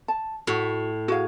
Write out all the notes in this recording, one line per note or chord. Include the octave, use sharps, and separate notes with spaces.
A5
A2 F#4
F#4 G#4 F5